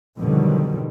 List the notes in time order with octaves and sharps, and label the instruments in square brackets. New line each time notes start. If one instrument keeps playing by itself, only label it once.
[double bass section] F2 B2 D3 D#3 F#3 G3